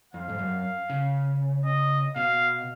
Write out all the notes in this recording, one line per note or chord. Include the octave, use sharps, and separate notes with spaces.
F2 F5
G#2
F#2
C#3
D#5
B2 F5